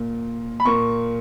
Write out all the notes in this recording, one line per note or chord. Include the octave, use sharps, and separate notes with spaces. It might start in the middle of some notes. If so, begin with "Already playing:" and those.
Already playing: A#2 A#3
B5
A#2 A#3 C#6